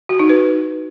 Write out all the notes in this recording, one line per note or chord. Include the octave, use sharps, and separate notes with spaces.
F#4
D#4
B4